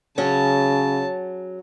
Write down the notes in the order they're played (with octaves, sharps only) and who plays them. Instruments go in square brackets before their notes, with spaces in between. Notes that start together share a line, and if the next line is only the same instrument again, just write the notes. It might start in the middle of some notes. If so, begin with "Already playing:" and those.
[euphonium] C#3 [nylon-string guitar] F#3 C#4 G#4 [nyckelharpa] A5